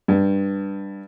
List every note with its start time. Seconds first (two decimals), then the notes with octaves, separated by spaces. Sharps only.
0.08 G2